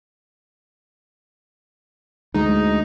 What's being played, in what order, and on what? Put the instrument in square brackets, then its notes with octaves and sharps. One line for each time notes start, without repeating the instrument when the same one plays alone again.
[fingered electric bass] D2 G#3 [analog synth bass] D#4